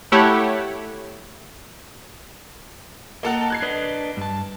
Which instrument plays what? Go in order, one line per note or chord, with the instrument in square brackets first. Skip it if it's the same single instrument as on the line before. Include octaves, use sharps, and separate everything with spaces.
[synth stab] A3 E4 G4 A4 C#5 F#5
[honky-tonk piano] A#3 A4 F#5 [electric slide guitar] D#5 A5 A#5
[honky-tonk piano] F#6 G#6 C7
[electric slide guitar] D4 B4 D#5
G2 A5